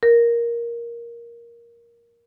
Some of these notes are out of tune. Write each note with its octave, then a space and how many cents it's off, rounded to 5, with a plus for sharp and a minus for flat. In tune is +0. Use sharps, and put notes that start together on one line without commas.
A#4 +10